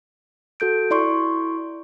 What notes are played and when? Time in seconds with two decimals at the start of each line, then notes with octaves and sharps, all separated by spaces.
0.60 F#4 A4 G6 D7
0.90 E4 D5 C6 C#6